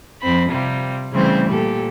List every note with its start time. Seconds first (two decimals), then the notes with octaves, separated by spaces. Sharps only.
0.21 F2 C4 B5
0.51 C3 G3 F4
1.13 C#3 E3 G3 A3 C4 C5
1.50 A#2 G4 A4